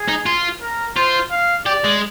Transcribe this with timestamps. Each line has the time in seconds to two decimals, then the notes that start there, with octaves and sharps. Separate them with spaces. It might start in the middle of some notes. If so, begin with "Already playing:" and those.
Already playing: G#4
0.08 D#4
0.26 F4
0.61 A#4
0.96 F4 C5
1.31 F5
1.66 G4 D5
1.84 G#3